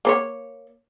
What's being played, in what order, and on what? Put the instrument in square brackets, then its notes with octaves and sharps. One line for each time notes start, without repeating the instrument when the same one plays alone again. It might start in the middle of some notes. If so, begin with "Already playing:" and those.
[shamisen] A#3 C5 C#5